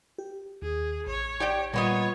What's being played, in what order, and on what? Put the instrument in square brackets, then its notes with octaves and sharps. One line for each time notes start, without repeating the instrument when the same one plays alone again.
[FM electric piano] G4
[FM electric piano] D#2 [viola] G#4
[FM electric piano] A1 [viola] C#5
[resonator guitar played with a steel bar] G4 D5 G5
[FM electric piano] A#2 G3 [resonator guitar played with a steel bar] A#3 B3 D#5 [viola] F4 C#5